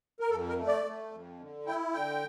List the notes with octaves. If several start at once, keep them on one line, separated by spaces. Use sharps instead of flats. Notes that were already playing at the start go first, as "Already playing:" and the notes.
A#4
F2 A4
A#4
A3
D5
A3
F2
D3
E4 G5
D3 G5